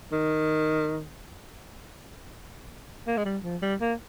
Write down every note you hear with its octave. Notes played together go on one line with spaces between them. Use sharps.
D#3
A#3
G#3
G3
F3
G3
A#3